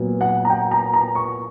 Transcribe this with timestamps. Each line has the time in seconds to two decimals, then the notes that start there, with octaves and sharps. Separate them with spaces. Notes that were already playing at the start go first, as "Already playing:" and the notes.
Already playing: A#2 F#3 B3
0.21 F#5
0.45 A#5
0.50 G5
0.71 A#5
0.94 A#5
1.15 C#6